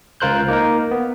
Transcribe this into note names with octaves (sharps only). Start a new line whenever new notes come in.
C#2 F4 A#4 C5 F#6 G6
A#3 D#4 A#4
B3